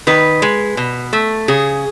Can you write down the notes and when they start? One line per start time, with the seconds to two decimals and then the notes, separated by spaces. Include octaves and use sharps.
0.07 D#3 B4
0.42 G#3
0.77 B2
1.13 A3
1.48 C#3 G#4